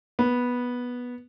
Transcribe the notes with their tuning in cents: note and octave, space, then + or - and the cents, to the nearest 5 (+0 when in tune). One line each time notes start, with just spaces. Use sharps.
B3 -10